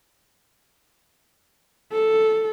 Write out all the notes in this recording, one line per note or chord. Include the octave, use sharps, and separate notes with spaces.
A4